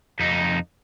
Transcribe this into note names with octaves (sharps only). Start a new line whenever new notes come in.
F2 D#4